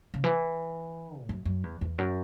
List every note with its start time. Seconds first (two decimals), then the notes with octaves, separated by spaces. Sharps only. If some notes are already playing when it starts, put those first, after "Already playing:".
0.14 C#3
0.24 E3
1.21 A2
1.29 F#2
1.45 F#2
1.64 E2
1.81 E2
1.98 F#2